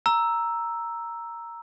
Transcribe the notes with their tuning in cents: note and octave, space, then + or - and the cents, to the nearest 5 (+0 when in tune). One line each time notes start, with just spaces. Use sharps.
A#5 +0 E6 +0